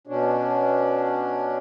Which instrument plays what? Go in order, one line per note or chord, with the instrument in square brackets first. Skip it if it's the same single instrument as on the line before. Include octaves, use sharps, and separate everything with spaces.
[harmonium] B2 C#4 D4